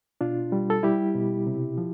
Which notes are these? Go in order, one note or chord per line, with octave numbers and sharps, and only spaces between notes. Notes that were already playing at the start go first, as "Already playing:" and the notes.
B2 D4 F4
G3
A4
G3 E4 G4
B2
C3
F3